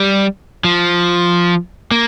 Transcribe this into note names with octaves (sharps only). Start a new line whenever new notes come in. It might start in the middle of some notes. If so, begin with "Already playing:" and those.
Already playing: G3
F3
A#3